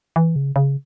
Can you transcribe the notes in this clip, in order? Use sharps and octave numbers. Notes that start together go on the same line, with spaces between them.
E3
C#3
C#3